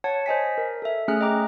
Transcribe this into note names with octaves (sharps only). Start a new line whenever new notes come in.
C#5 F#5 A5 G#6
C5 D#5 G#5 B6
A#4
A4 E5
A3 C#4 G#4 G#5 F6 F#6
D#5 G5 A#5 D6